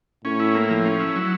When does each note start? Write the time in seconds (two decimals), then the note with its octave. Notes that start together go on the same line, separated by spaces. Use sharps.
0.25 A2 C#4
0.40 E4
0.54 A#3
0.70 F3
0.85 C#4
1.00 E4
1.16 F#3